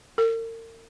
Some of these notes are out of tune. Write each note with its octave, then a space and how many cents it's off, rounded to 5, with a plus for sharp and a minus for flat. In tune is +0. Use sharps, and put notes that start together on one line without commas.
A#4 -40